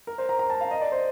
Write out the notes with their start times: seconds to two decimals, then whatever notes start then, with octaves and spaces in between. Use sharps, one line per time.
0.07 A#4
0.18 C5
0.29 A#5
0.39 A#5
0.50 A5
0.61 F5
0.71 D#5
0.81 D5
0.92 C5